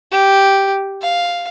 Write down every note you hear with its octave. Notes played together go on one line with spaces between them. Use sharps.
G4
F5